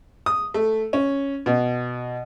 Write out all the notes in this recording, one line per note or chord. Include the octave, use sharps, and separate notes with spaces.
D#6
A3
C#4
B2